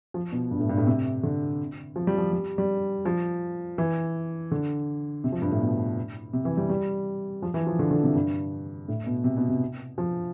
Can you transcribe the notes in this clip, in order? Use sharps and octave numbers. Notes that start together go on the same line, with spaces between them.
F3
B2
G2
A2
G2
A2
C3
D3
F3
G3
F3
G3
G3
F3
E3
D3
C3
F3
G2
A2
B2
C3
E3
G3
G3
F3
E3
F3
D3
D3
C3
G2
A2
B2
C3
B2
C3
F3